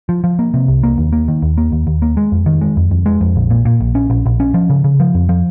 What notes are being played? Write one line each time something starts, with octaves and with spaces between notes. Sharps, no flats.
F3
F3
A#3
C3
C2
A#3
D#2
A#3
D#3
D#2
A#3
D#2
D#2
A#3
G#3
F2
D#3
G#3
F2
F2
G#3
F2
A#1
A#2
A#2
A#1
C#4
A#1
A#1
C#4
F3
C#3
C#3
F3
F2
F3